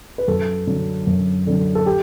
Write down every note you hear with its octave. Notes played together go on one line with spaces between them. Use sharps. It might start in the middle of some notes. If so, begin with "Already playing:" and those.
B4
F#2 A4
D3 F#3
F#2
D3 F#3
A4
G4